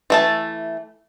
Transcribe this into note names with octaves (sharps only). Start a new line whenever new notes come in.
E3 A3 A5